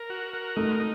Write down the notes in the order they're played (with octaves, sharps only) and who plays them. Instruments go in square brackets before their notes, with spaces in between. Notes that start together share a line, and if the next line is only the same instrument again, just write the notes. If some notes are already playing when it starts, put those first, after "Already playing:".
Already playing: [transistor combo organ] A#4
F#4
A#4
[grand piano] A3 [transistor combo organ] D#4
[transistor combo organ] D#4